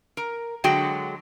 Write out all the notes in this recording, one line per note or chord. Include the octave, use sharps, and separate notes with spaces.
A#4
D3 F#3 G#3 F#4 G5